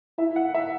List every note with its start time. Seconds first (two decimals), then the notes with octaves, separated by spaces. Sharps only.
0.18 E4 E5
0.36 F#5
0.54 E5